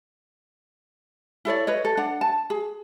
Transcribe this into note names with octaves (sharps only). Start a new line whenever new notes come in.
E4 A4 C#5 D5
B4 C#5 D#5
A4
D4 F#5
A5
G#4